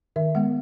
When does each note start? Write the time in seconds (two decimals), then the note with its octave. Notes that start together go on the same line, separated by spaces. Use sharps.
0.16 D#3 E5
0.35 G#3 B3 F#5